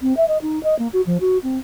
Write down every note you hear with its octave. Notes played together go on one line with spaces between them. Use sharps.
C4
E5
D#5
D#4
D#5
A#3
F#4
F3
F#4
C4